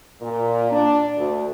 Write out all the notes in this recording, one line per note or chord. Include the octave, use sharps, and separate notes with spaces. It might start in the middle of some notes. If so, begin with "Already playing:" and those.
A#2
D4
D2